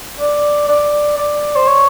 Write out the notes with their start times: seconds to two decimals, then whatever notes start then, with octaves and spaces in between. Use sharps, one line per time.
0.20 D5
0.69 D5
1.18 D5
1.56 C5
1.68 C#5